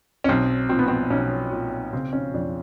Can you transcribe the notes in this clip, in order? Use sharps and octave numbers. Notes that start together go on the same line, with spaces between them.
C#4
B1 C4
A#2 C4
B3
C4
B1 C#4
A#2
C#3 C4
C#4
F2 D4